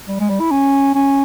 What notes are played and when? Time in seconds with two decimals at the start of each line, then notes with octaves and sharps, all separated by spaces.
0.08 G3
0.20 G#3
0.29 G3
0.40 E4
0.51 C#4
0.95 C#4